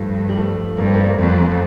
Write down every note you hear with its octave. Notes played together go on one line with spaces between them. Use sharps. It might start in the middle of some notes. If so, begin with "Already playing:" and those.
Already playing: G2 F3 A3
G3
F3 A3
G2 A#3
C4
G3 A#3
A#3
F2 F3 A3